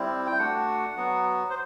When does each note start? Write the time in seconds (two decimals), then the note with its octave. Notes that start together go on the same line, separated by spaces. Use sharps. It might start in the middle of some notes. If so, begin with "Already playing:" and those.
Already playing: G3 C4 E4
0.27 G5
0.39 A3 D4 F#4 F#5
0.97 F#3 B3 F#4
1.50 C5